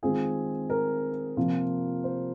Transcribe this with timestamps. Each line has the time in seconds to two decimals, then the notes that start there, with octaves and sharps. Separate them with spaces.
0.03 D#3 G#3 C4 F4 G#4
0.70 A#4
1.37 C3 F3 A#3 F4
2.04 C5